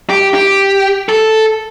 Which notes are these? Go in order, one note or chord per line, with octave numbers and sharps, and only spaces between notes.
G4
G4
A4